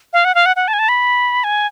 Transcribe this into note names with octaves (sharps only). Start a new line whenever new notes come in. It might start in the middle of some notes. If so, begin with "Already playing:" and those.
F5
F#5
F5
F#5
F#5
A5
G#5
A5
B5
G#5